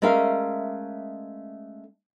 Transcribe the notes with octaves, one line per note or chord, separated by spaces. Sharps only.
G#3 A3 C#4 A#4 E5 F5